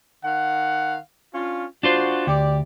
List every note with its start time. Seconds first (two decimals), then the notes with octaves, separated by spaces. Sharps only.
0.24 D#3 F5 F#5
1.34 C#4 D4 F4
1.83 D4 F4 F#4 C5
2.27 D2 G4 D5